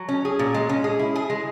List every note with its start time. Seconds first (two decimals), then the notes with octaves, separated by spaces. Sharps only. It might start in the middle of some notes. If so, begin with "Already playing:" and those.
Already playing: F#3
0.09 C#4
0.25 G#4
0.39 A#2
0.54 G#3
0.69 C#4
0.84 G#4
0.99 E4
1.16 G#4
1.30 G#3